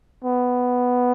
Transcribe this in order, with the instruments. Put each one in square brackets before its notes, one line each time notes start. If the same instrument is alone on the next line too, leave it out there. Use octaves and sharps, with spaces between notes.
[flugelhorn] B3